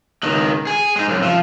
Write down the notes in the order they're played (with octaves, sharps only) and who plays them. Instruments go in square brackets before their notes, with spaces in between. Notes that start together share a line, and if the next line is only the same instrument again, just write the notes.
[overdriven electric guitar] C#2 D#3
G#4 G#5
G#3 D#4
C2 F#2
F3